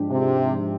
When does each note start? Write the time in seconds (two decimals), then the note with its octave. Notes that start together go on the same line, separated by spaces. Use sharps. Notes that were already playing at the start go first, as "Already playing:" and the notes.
Already playing: G#2 F3 G#3 D4 G4
0.10 C3